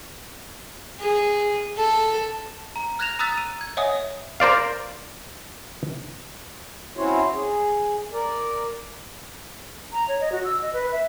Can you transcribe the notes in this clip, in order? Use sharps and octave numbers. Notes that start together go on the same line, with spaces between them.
G#4
A4
A#5
F6 F#6 G#6 A#6 E7 F7
A#5 D#6 E6 F#6 A6 B6
D#7
G#6
C#5 D#5 E5 F#5 G#5 D#6
A#4 C5 D5 F5
C4 C#4 E4 F#4 C5 C#5
G#4
A#4 D5
A#5
C#5
D#5
F#4
E6
D#5
B4
E5